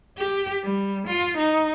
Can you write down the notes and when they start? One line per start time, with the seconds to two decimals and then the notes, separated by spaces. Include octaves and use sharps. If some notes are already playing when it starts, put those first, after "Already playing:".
0.18 G4
0.64 G3
1.07 F4
1.37 D#4